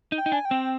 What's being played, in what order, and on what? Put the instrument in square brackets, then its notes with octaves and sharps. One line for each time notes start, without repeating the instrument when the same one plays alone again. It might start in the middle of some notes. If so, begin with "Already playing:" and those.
[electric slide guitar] D#4
[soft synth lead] G5
[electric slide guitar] D#4
[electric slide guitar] D4 [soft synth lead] G#5
[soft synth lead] G5
[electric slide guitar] C4